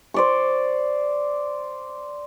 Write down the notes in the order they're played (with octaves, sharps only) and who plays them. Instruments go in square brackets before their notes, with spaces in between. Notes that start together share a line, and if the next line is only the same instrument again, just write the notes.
[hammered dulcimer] C5 D5 C#6